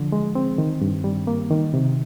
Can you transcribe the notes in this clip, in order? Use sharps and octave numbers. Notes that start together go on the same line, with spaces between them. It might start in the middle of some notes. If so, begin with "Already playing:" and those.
Already playing: D3 F3
G#3
C4
D#3
G2
G3
A#3
D#3
C3